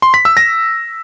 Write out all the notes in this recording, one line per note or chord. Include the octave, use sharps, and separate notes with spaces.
C6
B6
E6
A#6